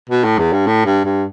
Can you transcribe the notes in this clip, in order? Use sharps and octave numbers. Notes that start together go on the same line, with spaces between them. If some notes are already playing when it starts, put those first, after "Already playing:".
B2
A2
E2
G2
A2
G2
G2